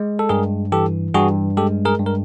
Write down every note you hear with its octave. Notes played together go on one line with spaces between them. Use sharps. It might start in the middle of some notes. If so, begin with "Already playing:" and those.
Already playing: G#3
A4
G2 G#4 A#4
E3 G4 A4
G2 F#4 G#4
G#3 G4 A4
G#4 A#4
G2
A#4